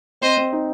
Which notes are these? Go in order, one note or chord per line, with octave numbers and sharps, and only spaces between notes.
C4 C5 D#5
C4
D#4